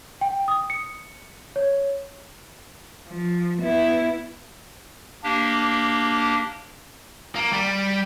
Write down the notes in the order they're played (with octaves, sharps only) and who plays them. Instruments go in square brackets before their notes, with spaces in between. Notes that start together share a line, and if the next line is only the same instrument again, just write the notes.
[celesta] G5
D#6
C#7
C#5
[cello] F3
B3 E4
[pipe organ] A#3 D4 G4
[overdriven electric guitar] A#3
G3